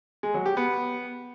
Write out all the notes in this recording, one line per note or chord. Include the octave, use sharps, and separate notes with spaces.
G#3
F#3
G4
B3